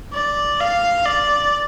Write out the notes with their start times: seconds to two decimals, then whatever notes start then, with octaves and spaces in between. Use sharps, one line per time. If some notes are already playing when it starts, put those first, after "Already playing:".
0.13 D5
0.60 F5
1.06 D5